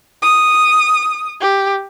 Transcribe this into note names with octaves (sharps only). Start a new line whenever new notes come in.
D#6
G4